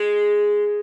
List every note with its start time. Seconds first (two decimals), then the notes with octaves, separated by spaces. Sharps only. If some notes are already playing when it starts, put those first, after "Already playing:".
Already playing: G#3